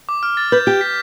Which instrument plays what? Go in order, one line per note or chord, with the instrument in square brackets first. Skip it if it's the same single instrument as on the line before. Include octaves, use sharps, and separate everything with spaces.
[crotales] D6
F6
A6
[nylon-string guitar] B4 [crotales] G6
[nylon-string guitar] G4 [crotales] G6
[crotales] B6